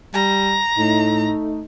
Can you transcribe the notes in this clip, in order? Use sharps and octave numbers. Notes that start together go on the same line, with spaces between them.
G3 A#5
A2 A3 D#4